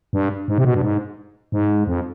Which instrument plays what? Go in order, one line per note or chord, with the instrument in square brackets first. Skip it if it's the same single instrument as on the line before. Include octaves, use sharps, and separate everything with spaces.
[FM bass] G2
G#2
C3
B2
G2
G#2
G#2
F2